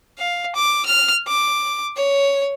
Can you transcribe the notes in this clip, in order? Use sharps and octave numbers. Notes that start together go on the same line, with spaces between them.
F5
D6
F6
D6
C#5